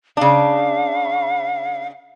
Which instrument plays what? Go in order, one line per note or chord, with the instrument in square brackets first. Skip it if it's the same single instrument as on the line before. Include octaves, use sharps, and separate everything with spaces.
[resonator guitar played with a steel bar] C#3 D4 [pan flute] F5